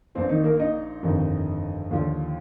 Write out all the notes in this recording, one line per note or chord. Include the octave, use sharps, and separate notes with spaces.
A#1 A#2 F3 C4
D#3 D#4
A#3 A#4
D#4 D#5
G1 F2 C3 D#3
D#2 D3 F3